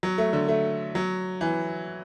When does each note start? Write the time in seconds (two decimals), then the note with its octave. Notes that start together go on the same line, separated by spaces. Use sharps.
0.03 F#3
0.18 A3
0.33 D3
0.48 A3
0.95 F#3
1.41 E3